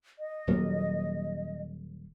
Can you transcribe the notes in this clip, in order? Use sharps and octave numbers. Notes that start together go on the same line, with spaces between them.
D#5
D#1 F#3 A#3